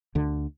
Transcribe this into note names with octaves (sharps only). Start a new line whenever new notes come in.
D2 D3